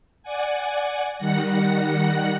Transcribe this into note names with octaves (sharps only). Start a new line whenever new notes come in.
D5 F#5 G#5
D#3 G3 F#5 F#6 A#6 C#7